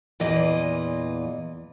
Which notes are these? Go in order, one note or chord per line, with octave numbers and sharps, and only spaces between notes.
E2 A#2 E3 F4 D#5